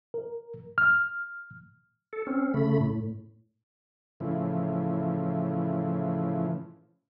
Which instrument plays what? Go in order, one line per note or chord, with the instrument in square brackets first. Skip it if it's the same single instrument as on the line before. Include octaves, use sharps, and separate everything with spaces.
[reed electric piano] A#4
F6
[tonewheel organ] A4
C4 C#4
C#3 A3 B5
A2
[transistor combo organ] A2 C#3 E3 F3